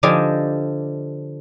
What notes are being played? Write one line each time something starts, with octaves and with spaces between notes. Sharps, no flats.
D3 F3 D4 G4 D#5 G#5